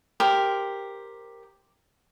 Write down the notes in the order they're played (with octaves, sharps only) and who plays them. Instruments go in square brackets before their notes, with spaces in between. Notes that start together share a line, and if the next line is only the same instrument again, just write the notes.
[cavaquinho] G4 A#4 C5